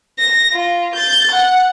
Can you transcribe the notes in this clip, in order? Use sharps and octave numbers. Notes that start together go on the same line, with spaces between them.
A#6
F4
G6 A6
F#5